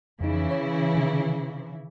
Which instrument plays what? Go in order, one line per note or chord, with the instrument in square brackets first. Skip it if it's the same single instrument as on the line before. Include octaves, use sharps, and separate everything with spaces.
[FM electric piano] F2 D#4 [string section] C#3 E3 E4
[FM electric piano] C#5
C3 D#3